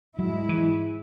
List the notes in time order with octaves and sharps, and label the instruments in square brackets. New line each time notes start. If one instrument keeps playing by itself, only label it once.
[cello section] G#2 G#3 E4 [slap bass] F#3
[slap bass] E3